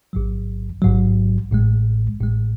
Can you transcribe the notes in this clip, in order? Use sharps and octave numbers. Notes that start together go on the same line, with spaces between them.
A1 G#2 F#3
A1 G#2 F#3
A1 A2 G#3
A1 A2 G#3